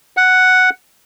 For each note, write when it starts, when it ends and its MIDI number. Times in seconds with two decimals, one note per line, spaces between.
0.17 0.70 78